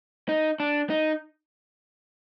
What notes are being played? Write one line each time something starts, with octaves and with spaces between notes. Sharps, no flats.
D#4
D4
D#4